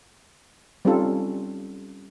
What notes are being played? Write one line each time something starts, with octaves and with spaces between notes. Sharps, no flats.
G3 C4 C#4 D#4 F4 A4